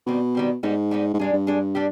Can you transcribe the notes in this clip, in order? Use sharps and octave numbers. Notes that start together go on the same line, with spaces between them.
B2 D#3 G3 C4
D#3 G3 C4
G#2 G3 B3 D#4
G3 B3 D#4
G#2
G2 G#3 D4 G#4
G2
G#3 D4 G#4
G3 D4 G4